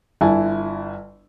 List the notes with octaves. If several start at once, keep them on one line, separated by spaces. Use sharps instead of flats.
G1 E4 G#5 A5